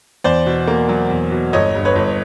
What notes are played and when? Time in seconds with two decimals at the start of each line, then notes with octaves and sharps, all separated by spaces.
0.24 E2 C5 D5
0.46 B2
0.68 A#3
0.89 F#3
1.10 E2
1.32 B2
1.53 G1 C#5 D#5
1.75 G2
1.85 B4 C#5
1.96 G1